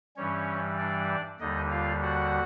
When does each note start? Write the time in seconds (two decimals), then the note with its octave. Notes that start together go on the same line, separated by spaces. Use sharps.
0.16 G2 E3 G3 C#4 C#5
0.78 D4 D5
1.40 D#2 D3 G3 D#4 D#5
1.71 F4 F5
2.02 F#4 F#5